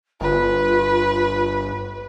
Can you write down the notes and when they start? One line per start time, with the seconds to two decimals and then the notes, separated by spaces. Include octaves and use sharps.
0.21 G1 F4 B4